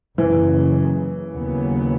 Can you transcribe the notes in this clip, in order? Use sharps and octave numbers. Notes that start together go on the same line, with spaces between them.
F#1 F#2 C#3 E3
D#2 C#3 F#3 B3